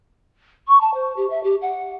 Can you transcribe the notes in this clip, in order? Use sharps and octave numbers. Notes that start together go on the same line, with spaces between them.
C#6
A5
C5
G4
E5
G4
F#5